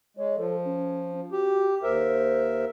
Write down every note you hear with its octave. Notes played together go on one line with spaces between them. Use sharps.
G#3 C#5
F3 A4
C#4
F#4 G4
D#2 A#4 C5 E5